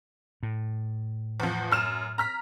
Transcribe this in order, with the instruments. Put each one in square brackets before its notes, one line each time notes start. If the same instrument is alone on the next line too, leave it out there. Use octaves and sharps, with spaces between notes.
[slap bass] A2
[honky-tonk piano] E2 F3
F#2 F6 E7
A#5 F6 B6